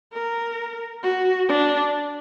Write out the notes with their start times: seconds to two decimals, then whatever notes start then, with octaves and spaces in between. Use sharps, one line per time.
0.13 A#4
1.03 F#4
1.49 D4